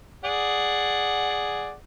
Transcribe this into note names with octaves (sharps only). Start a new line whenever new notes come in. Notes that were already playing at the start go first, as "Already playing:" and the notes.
G#4 D5 F#5